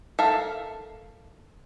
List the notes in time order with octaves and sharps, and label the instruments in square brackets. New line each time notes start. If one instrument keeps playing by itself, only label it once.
[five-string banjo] A4 A#4 E5 F5